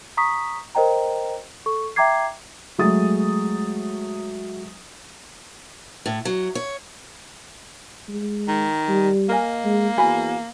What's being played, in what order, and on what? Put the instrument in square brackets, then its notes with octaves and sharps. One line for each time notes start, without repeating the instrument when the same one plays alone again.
[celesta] A#5 C#6 D#6 B6
A#4 C5 D#5 G5 A#5
A4 C#6
E5 G5 A#5 D6 G#6 C7
[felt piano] F#3 G#3 A3 D#6 A6
[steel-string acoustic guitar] A2
F#3
C#5
[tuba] G#3
[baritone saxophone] D#3
[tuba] G3
[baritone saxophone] A#3 [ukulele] A#4 D#5 G#5
[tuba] G#3
[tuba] E2 [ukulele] F#4 G#5 B5